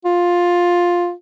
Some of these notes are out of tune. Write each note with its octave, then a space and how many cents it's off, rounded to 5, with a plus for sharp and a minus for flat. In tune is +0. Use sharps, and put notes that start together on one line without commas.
F4 +10